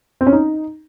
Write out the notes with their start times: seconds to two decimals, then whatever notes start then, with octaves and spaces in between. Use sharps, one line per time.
0.21 C4
0.27 C#4
0.32 D#4